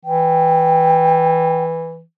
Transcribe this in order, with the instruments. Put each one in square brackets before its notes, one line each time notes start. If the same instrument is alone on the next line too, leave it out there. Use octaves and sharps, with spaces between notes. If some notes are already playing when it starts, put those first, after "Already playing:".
[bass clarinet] E3 [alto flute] G5